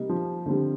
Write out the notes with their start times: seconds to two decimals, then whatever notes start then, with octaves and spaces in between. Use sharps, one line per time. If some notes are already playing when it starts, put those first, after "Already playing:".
Already playing: C3 G3 A#3 D#4
0.09 F3
0.46 D3 G3 C4